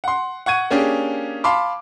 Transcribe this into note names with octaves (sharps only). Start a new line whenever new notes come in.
F#5 C6
F#5 C#6 G#6 D#7
A#3 C#4 D4 G4 G#4
F5 A5 B5 C6 D6